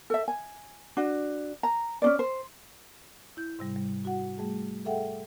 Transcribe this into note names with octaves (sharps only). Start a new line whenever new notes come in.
A4 E5
G#5
D4 F#4
A#5
C#4 D4 D5
C5
E4 G6
G#2 C3 G3
G3
F#4 F#5
G3 A3 G#4
G#4 A4 E5 F#5 G5